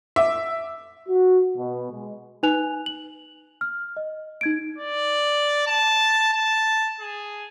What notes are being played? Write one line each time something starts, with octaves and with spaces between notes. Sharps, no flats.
E5 D6
F#4
B2
G#3
D#4 B4 G#5 F#6 F7
F#7
F6
D#5
D#4 G#6 D7
D5
A5
A5
G#4